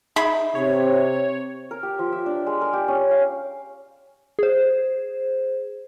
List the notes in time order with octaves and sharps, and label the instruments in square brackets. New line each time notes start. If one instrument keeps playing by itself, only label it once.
[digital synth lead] D#4 [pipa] G#4 E5 B5
[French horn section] C3 [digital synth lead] C#5
[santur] A#4
G4
F3
E5
D4
G#3
A#4
G4
C#4
F5
[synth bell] G#4 C5